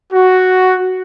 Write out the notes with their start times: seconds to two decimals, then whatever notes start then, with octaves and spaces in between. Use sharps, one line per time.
0.13 F#4